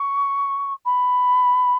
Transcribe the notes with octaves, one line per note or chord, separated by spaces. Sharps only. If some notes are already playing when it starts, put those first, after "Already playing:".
Already playing: C#6
B5